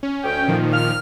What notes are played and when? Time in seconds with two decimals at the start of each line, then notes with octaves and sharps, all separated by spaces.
0.03 C#4
0.22 D2 G5
0.48 A#2 D#3 F3
0.72 F6